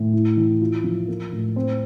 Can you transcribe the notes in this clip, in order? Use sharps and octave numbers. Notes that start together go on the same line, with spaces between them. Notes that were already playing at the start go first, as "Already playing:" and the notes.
Already playing: A2
E4
E3
F4
F3
A#3
A2
C4